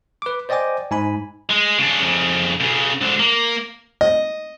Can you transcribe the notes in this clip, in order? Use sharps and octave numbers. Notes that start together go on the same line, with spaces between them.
B4 D6
C5 D5 D#5 G5 G#5 D6
G#2 G#5 B5
G#3
C#3 D4
F2 C#3
B1 C#3
G#2 D3
A#3
D#5